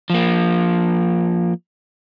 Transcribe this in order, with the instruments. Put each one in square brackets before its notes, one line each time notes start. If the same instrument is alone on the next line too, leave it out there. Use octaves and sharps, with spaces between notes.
[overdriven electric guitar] F3 A#3